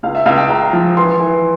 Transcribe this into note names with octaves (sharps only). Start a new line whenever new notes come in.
C#2 F5
E5
C#2 F5
G5
C#2 A#5
F3
E3 C6
E3